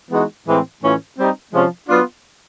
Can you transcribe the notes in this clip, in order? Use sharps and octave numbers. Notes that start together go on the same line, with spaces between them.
E3 G#3 B3 D#4 F#4
A2 E3 G#3 C4
A2 E3 A3 C#4 F4
G3 C4 D#4
C3 F3 G#3 C#4 F4
F#3 B3 D4 F4